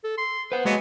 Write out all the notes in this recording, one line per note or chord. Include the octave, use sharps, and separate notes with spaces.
A4
C6
B4 C5 F#5
F#3 G#3 A#3 B3 G#4 D#5